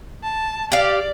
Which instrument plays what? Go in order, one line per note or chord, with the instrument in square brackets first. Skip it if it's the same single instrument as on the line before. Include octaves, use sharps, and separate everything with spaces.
[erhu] A5
[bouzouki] G4 F5 [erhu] D5